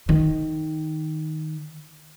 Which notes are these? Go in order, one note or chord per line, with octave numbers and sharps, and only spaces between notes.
D#3